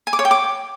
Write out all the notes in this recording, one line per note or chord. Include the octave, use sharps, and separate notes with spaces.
G#5
D6
C#5
G5
D6